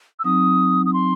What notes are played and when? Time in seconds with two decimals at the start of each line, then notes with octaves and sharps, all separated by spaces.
0.19 E6
0.24 F#3 C4 D#4 D#6
0.86 D#6
0.93 C6